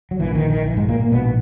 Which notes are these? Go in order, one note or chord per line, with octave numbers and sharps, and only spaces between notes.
F#3
A#1 A#2 E3
D#3
D#3
E3
G#2 G#3
A#2 A#3
A#2 A#3
A#1 G#2 B2 B3